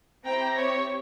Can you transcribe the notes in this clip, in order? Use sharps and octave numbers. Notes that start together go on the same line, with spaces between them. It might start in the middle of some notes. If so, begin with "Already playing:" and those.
C4 E4 G4 G5 A#5
C#5